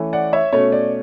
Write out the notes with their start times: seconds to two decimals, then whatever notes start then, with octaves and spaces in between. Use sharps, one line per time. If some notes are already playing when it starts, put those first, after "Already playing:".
Already playing: E3 A3 C#4
0.13 D5 F#5
0.33 C#5 E5
0.53 B2 A3 C#4 C#5
0.72 D5